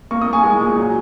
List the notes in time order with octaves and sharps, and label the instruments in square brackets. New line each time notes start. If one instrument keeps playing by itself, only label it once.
[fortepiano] A#3 [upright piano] C#6
[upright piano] D#6
[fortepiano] A#3
[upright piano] G#5 C#6
[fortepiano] G#3
A#2
F#3